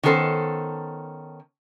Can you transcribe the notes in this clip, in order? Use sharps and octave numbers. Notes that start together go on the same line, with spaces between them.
D#3 B3 C#4 A4 C5 A5